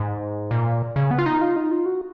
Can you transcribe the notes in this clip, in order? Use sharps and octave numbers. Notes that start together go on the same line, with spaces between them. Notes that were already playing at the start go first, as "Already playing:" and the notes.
Already playing: G#2
A#2
C#3
B3
F4
D#4
F4
D#4
F4
F#4